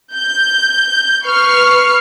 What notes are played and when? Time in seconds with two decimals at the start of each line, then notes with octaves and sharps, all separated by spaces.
0.13 G6
1.24 B4 C#6 F6 C7